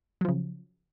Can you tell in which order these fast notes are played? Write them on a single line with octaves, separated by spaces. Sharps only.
F#3 F3 C#3